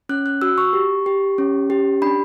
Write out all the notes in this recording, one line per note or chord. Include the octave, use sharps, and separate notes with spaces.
C#4 F#6
F#6
F#4 E6
C#6
G4
G4
C#4
G4
D4 B5